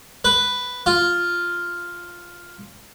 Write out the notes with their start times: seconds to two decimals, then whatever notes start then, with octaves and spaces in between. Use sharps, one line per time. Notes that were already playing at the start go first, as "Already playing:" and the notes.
0.25 B4
0.86 F4